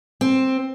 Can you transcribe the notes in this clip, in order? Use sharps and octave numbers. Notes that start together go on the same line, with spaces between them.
C4